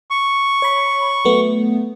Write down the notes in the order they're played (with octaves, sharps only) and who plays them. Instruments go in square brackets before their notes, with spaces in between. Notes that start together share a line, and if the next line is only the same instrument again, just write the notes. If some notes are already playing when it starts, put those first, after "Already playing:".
[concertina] C#6
[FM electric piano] C#5 B5
F#3 A3 B3